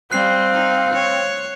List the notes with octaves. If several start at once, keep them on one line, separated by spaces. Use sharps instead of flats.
G3 C4 F5 F#6 C7
D#4
C#5